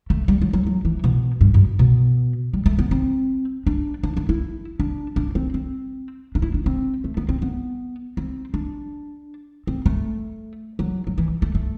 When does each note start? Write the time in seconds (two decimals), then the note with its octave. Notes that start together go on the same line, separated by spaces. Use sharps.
0.10 A3
0.28 G3
0.42 F#3
0.53 F#3
0.67 F#3
0.85 E3
1.04 B2
1.41 G2
1.54 F#2
1.79 B2
2.53 G3
2.66 A3
2.79 B3
2.91 C4
3.67 D4
4.03 D4
4.17 D4
4.29 E4
4.80 D4
5.16 D4
5.35 C4
5.54 C4
6.35 D4
6.42 E4
6.54 D4
6.66 C4
7.04 A3
7.17 B3
7.29 C4
7.42 B3
8.17 C4
8.54 D4
9.67 C4
9.86 A3
10.79 F#3
11.07 F#3
11.18 E3
11.42 A3
11.55 A3